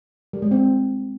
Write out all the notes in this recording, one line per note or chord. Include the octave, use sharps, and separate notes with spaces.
G3
G#3
C4